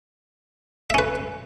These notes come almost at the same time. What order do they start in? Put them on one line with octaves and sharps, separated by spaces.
E5 C#4 B4